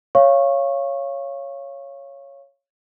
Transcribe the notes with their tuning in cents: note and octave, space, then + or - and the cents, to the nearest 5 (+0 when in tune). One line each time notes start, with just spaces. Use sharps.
C#5 +0 F5 -20 C#6 -20